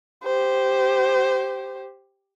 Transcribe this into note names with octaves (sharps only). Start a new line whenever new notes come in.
G4 C5